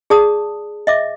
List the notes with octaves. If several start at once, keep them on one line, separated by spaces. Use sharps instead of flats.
G#4 D5 A5 D#6
D#5 E5 D6